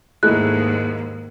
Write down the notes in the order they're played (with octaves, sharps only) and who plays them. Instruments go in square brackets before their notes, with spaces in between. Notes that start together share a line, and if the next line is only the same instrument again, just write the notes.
[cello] D#2 G#2 [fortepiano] G#3 A3 E4 [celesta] F#6